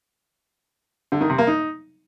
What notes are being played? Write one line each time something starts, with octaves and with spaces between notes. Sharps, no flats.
D3
D#3
C3
A#3
D#4